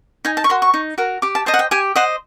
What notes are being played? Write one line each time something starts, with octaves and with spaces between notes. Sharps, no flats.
D#4 G#5
A5
C#6
F#4 A#4 C6
C#6
D#4
F#4 A#4
G4 D6
A5
C5 D#5 A5
F#5
G5
G4 G#5
C5 D#5 F#5